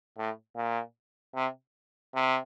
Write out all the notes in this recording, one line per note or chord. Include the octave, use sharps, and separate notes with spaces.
A2
A#2
C3
C3